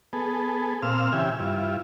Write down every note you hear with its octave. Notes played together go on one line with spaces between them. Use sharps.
B3 G#4 A4
A#2 C4 F5 E6 F6
C#3 E3 G4 E5 G#5
G2 E4 F4